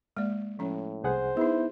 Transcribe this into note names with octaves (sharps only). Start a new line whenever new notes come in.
G#3 A#3 D5
A2 F3 C#4
C2 G#4 C5 F#5
B3 D#4 E4 G#4